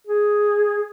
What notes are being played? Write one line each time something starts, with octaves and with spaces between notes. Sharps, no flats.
G#4